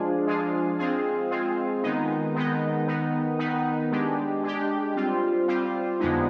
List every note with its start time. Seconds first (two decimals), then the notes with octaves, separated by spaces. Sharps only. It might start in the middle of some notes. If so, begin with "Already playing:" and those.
Already playing: F3 G#3 D4 F4 G#4
0.27 F3 G#3 D4 F4 G#4
0.79 G#3 C4 F4 G#4
1.31 G#3 C4 F4 G#4
1.83 D#3 G#3 B3 D#4
2.35 D#3 G#3 B3 D#4
2.87 D#3 B3 D#4
3.39 D#3 B3 D#4
3.92 G#3 D4 G4
4.43 G#3 D4 G4
4.96 G3 C4 F4
5.48 G3 C4 F4
5.99 F2 D3 G#3 B3 D#4